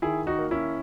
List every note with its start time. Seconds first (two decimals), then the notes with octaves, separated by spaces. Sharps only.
0.02 D#3 E4 G#4
0.27 D#4 F#4
0.39 A#3
0.51 C#4 E4